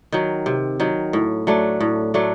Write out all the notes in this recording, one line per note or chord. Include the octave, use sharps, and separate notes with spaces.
D#3 F#3
C3
D#3 F#3
A2
F#3 A3 D4
A2
F#3 A3 D4